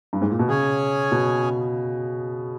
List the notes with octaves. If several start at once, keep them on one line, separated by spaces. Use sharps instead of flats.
G2
G#2
A#2
B2
C#3 C#4 G#4 C#5 G#5
B2